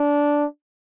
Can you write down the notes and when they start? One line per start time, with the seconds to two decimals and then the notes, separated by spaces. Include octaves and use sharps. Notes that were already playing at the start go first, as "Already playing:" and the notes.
Already playing: D4